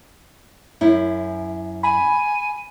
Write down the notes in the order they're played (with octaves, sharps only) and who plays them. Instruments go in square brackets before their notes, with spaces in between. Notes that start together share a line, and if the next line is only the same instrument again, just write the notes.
[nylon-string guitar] F#2 E4
[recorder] G#5 [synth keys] B5